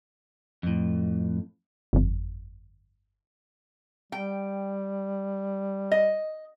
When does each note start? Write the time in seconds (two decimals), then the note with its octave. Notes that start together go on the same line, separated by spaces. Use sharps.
0.63 F2 A2
1.93 G1 F2
4.12 G3 G5
5.91 D#5